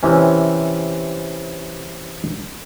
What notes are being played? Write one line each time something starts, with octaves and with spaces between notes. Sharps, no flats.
C3 E3 C#4